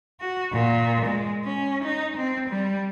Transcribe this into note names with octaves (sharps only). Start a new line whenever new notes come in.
F#4
A#2
G#3
C#4
D#4
C4
G3